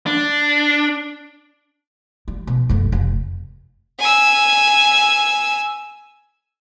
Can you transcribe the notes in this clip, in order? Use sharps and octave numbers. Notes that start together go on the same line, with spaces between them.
D4
G3
B2
F#1 A3
F1
G#5 E6